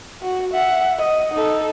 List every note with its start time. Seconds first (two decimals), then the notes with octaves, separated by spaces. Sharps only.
0.22 F#4
0.53 E5 F#5
0.98 D#5
1.34 D#4 A4